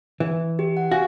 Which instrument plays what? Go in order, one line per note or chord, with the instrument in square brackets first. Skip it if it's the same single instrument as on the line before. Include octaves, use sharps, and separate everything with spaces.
[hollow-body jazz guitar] E3
[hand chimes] G4
F#5
[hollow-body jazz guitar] F#4 [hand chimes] F5 G#5